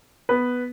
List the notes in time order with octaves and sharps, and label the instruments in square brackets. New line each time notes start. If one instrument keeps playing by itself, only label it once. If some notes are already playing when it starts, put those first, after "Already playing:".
[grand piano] B3 B4